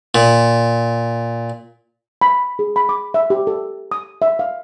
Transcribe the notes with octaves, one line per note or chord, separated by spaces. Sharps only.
A#2
B5
G#4
B5
D6
E5
G4
A4
D#6
E5
F5